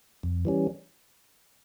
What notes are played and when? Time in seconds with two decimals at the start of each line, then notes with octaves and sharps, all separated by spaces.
0.23 F2
0.45 E3 G3 C#4